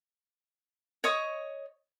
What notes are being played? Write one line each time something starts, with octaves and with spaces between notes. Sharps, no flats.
C#5 D#5 C#6 D#6